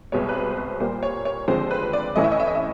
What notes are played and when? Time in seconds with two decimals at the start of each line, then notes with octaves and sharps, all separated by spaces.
0.12 C2 B2 G#3 B3 C#5
0.29 B4
0.35 C5
0.51 C5
0.57 B4
0.80 A#2 G3 A#3 C5
1.03 C#5
1.25 C#5
1.48 D#2 D3 F3 G#3 C4 C5
1.71 B4
1.93 D5
2.16 A2 E3 A3 C#4 E4 D#5
2.24 E5
2.32 D#5
2.40 E5
2.47 D#5
2.55 E5